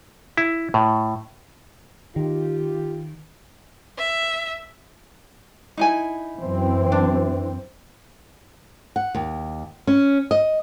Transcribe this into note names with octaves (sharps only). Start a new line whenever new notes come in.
E4
A2
D#3 F4 G4
E5
D#4 E4 G#5
F#2 E3 C4
D4
F#5
D#2
C#4
D#5